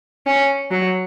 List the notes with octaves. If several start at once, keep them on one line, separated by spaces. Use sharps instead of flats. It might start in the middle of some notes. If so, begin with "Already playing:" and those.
C#4
F#3